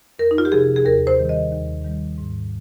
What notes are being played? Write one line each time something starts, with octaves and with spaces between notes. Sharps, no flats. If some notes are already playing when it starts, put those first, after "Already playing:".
F2 A#4
D#4
F4
G4
C3 F3 G#4
G#4
D#2 A#4
C5
D#3 G3
D#5
D#2
D#3 G3
G#2